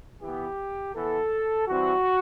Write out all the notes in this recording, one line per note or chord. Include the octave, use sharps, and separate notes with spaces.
E3 B3 G4
E3 B3 A4
E3 G3 C4 F#4